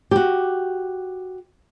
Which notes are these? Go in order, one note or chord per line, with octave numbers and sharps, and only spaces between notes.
F#4 G4